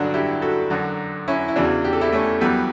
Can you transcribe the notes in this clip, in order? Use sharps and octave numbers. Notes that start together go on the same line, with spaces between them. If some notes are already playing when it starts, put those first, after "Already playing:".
Already playing: G2 D3 F#3 D4 F#4
E4 G4
F#4 A4
F#2 D3 F#3
C#4 E4
E4
E2 C#3 E3 D4 F#4
G4
A4
E4 G4
A3 C#4
F#2 E3 G3 B3